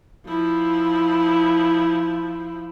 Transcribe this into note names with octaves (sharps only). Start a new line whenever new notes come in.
F3 E4